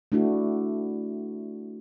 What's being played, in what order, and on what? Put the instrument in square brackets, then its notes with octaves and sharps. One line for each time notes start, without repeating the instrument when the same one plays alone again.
[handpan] A3 D4 E4 F#4